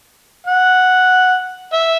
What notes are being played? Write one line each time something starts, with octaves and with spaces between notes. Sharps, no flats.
F#5
E5